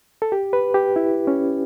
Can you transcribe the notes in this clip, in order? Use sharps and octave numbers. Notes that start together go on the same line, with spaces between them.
A4
G4
B4
G4
E4
C#4